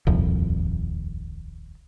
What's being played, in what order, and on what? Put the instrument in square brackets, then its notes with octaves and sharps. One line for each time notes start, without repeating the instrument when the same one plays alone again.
[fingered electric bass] D#1 C2 F2